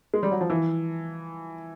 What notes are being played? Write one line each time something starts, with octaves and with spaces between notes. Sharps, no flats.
G#3
G3
F#3
F3
E3